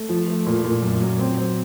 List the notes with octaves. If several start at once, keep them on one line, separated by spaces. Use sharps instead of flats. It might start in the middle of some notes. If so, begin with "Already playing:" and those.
Already playing: A3
F3
A3
A#2
A#2
F#2
F#3
C4
C4